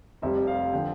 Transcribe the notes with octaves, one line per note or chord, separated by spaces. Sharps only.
F1 F2 C3 G3 E5
F5
D3 F3 G5